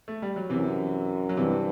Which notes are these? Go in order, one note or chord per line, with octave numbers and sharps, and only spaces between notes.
A3
G3
F#3
F#2 C3 E3
F#3
G2 C3 E3